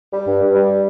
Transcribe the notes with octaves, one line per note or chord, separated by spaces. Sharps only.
G3
G2
G2
G3